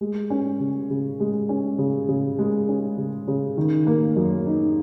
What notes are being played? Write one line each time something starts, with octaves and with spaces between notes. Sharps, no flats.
G#3
C#4
C#3
C#3
G#3
C#4
C#3
C#3
G#3
C#4
C#3
C#3
D#3
A#3
F#2
D#4